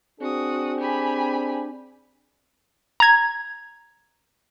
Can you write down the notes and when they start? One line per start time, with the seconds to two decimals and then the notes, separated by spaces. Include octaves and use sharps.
0.21 C4 D4 F#4 G#4 D#6
0.80 G4 G#5 B5
3.00 A#5 G#6